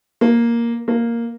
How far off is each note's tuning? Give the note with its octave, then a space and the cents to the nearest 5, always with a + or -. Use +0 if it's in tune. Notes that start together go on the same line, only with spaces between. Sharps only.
A#3 +5
A#3 +0